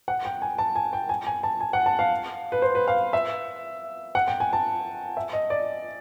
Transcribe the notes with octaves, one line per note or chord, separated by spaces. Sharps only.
F#5
G5
G#5
A5
G#5
G5
G#5
G#5
A5
G#5
F#5
A5
F5
B4
C5
B4
F5
E5
F#5
G5
G#5
A5
E5
D#5
D5